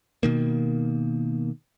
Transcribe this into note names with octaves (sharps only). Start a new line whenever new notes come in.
B2 D#3 A#3